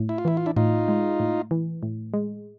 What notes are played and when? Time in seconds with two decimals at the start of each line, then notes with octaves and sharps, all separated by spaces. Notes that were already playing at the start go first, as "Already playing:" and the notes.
Already playing: A2
0.09 E4
0.18 F4
0.25 E3 E4
0.37 F4
0.46 D4 E4
0.56 A2 D#4 F4
0.88 G#3
1.20 A2
1.51 E3
1.83 A2
2.14 G#3